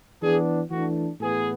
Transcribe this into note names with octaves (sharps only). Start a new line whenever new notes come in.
E3 B3 D4 G#4
E3 A3 D4 F#4
A2 E3 B3 G#4